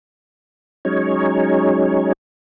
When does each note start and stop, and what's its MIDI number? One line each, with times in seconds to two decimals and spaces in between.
0.85 2.13 54
0.85 2.13 56
0.85 2.13 61
0.85 2.13 63
0.85 2.13 73